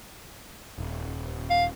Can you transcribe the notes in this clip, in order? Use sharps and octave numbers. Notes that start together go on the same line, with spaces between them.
D#1
F5